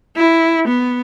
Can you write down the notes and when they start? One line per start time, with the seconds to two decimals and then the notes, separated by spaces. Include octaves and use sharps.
0.17 E4
0.68 B3